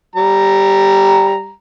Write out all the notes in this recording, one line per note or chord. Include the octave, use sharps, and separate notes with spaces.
G3 A#5